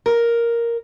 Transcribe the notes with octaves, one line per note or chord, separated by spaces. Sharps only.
A#4